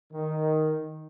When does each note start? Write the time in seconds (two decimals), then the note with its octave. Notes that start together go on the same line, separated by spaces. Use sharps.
0.12 D#3